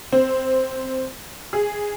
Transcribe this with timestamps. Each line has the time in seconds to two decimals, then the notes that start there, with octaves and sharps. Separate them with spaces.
0.12 C4
1.53 G#4